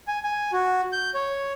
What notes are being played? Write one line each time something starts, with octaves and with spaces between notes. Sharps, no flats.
G#5
G#5
F#4
G6
C#5